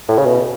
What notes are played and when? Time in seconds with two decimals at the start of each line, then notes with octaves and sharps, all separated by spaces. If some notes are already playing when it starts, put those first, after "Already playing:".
0.09 A2
0.18 C#3
0.25 B2